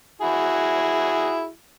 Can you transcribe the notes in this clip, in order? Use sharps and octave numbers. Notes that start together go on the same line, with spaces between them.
E4 F#4 G#4